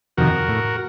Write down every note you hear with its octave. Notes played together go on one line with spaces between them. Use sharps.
F2 C3 D#3 F#4 A#4
A2